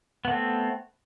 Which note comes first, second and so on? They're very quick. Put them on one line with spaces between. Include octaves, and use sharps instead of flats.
B3 A3 C4